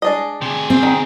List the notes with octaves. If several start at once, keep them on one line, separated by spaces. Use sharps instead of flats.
G#3 D4 D#5
C3 G#4
C4
D#3